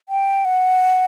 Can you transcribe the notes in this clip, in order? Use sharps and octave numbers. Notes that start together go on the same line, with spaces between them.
G5
F#5